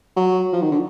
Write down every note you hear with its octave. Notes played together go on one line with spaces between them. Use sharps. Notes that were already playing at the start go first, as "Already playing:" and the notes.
F#3
F3
D#3
D3